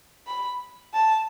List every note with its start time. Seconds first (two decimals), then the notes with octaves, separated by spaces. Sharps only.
0.27 B5
0.94 A5